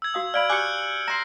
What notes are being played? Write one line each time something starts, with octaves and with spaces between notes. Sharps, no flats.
E6 G#6
F#4 F5 D#6
D5 F5 B5 F6 D7 F#7
G4 G#5 D6 F#6 G6 C#7
A#5 C6 A#6 C7